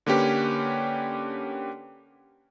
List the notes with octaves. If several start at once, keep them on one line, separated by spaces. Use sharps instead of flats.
D3 A#3 C#4 G4 B4